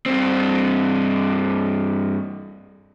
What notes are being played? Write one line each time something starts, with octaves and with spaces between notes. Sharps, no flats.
G2 C4